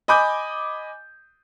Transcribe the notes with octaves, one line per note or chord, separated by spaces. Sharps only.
D#5 G#5 B5 D6 G6